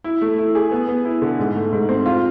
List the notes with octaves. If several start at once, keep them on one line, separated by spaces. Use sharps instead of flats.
E4
A3
E4
G#4
B3
B3
E4
D3
G#2
A3
G#2
C4
F4